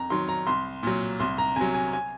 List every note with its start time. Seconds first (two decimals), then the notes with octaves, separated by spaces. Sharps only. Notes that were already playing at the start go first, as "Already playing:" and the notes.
Already playing: F2 A#5
0.10 D#3 F#3 C6
0.29 A#5
0.47 C2 C6
0.83 A#2 F#3
1.20 C2 C6
1.38 A#5
1.56 C3 F#3 G#5
1.74 G#5
1.93 G#5